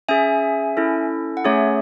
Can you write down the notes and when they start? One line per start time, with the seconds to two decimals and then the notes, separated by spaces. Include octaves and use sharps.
0.09 C#4 G#4 E5 G#5
0.77 C#4 E4 A4
1.37 F#5
1.45 A3 C#4 G#4 C#5 E5